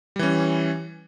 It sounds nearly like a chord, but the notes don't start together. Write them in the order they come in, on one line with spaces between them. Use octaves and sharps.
G3 E3 C#4